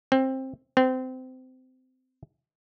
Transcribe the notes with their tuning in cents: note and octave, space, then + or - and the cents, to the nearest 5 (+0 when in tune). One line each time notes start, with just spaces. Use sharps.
C4 +15
C4 -25